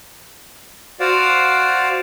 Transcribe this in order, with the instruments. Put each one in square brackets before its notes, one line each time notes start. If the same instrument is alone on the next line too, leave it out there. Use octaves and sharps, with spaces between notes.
[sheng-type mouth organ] F#4 C5 D5 F5 F#5